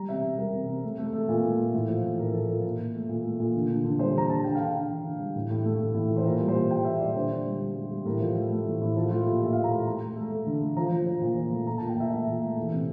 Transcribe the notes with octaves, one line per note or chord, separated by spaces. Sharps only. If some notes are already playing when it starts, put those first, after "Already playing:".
Already playing: G3 A#5
C3 E5
C3
G3 A#4
C3
C3
A3
A3
A3
A#2
A3
A3
A2
F3
A2
A2 A#4
F3 A4
F3 A#4
A#2
A#2
A3
A#2
A3
A#2
D3
D3
D3
G3 C5
D3 A#5
D3 A5
D3 G5
D3 F5
G5
D3
D3
D3
G3
A2
A2
A3
A2
A2
E3
C5
A#2 A#4
G3
C5
A#2
A#2 G5
A#2 E5
G3 D5
D3 C5
D3
G3
G3
G3
G3
A2 A#4
F3
A3
A3
A2
A2
F3 A4
A3 F4
A#2 G4
A#2 E5
A#2 F5
A#5
A3
A3 A#5
A3
A3
A3
D3
A3
F3 A#5
F3
F3
A#2
F3
A3
A#2 A#5
A#2 A5
G5
A#2 E5
A3 E5
A#2
A3
E3
C3